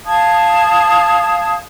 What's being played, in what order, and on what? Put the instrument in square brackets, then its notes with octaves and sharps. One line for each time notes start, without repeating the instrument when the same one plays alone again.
[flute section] F5 A5 D#6 G#6